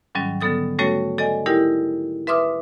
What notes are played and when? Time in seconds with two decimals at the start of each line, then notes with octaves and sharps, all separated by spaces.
0.15 G#2 D#3 F#3 G3 C#4
0.41 D3 G3 B3 A4 D#6 A6
0.79 G3 A3 C#4 F#4 A4 C#5
1.18 A4 D5 D#5 G#5
1.46 D#4 E4 G4 A#4 G5
2.27 B4 E5 C6 D6 D#6 F6